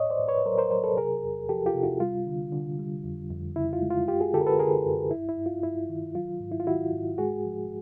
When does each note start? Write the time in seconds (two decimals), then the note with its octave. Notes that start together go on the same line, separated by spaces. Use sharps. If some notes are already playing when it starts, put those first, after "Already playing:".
Already playing: A2 C#5 D#5
0.10 C5 D5
0.19 A2
0.28 B4 C#5
0.46 F#3 A#4 C5
0.58 A#4 C5
0.71 F#3 A#4 C5
0.84 A4 B4
0.97 C3 G#4 A#4
1.24 E2
1.49 F3 G4 A4
1.66 F4 G4
1.74 C3
1.83 E4 F#4
2.00 G3 F4
2.27 D3
2.53 D3
2.79 G3
3.04 F2
3.31 F2
3.56 C#3 E4
3.73 F4
3.82 G#3
3.90 F4
4.08 F#2 F4 G4
4.20 F#4 G#4
4.33 D3 G4 A4
4.41 A#4
4.47 A4 B4
4.59 D3 G#4 A#4
4.85 F#2
5.11 G2 E4
5.29 E4
5.38 G2
5.46 F4
5.63 G2 E4
5.89 D#3
6.15 F#3 F4
6.40 G#2
6.52 E4
6.60 F4
6.66 D#3 E4 F#4
6.93 G#2
7.18 G#3 F#4 G#4
7.45 F3